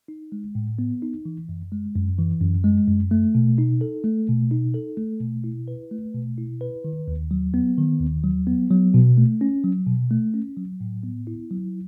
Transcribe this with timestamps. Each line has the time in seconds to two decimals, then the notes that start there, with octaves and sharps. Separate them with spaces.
0.08 D#4
0.32 G#3
0.55 A2
0.79 B3
1.02 D#4
1.25 E3
1.49 F#2
1.72 G#3
1.95 F#2
2.19 E3
2.42 F#2
2.64 G#3
2.88 F#2
3.11 A3
3.35 B2
3.58 D#4
3.81 A4
4.04 A3
4.28 B2
4.51 D#4
4.74 A4
4.97 A3
5.20 B2
5.44 E4
5.68 B4
5.91 A3
6.14 B2
6.38 E4
6.61 B4
6.84 D#3
7.08 D#2
7.31 F#3
7.54 B3
7.78 D#3
8.01 D#2
8.24 F#3
8.47 B3
8.70 F#3
8.94 B2
9.17 A3
9.41 C#4
9.64 F#3
9.87 B2
10.11 A3
10.34 C#4
10.57 F#3
10.81 A2
11.03 B3
11.27 E4
11.51 F#3